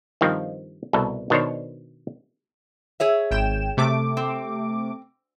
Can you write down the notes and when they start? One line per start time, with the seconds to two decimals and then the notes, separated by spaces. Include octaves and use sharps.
0.21 G2 D#3 F3 C4
0.93 C2 B2 A4
1.30 B2 D#3 D4 C5 C#5
3.00 G#4 C#5 E5
3.31 G#1 G5 E7
3.77 C3 A3 D6
4.17 C4